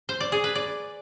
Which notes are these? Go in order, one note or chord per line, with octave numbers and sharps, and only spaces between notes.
C5
D5
G#4
B4
D5